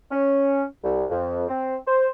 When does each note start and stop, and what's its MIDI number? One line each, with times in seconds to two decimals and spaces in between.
0.11 0.63 61
0.83 1.05 36
1.10 1.44 41
1.48 1.76 60
1.87 2.09 72